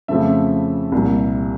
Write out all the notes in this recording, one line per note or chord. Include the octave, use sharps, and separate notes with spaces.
F2 C#3 F3 A3 E5
C2 A#2 G3